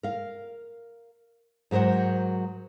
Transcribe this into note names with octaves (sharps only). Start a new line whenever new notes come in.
A#4 F5
G#2 F#3 A#4 C5 F#5